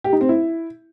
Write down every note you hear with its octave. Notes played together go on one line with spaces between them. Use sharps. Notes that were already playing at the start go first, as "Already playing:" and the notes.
G4
D#4
C4
E4